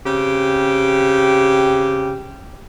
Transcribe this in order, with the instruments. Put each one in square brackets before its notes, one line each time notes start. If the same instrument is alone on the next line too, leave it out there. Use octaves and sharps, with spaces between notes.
[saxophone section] C#3 C4 G4